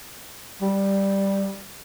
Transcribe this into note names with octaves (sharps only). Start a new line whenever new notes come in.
G3